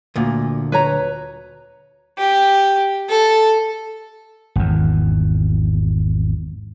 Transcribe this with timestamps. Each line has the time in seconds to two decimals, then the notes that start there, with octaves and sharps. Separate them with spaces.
0.16 D2 A#2
0.72 B4 C#5 A#5
2.18 G4
3.09 A4
4.56 G#1 E2